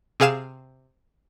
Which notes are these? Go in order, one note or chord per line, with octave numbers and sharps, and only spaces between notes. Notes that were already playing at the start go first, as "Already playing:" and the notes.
C3 G#4 F5 E7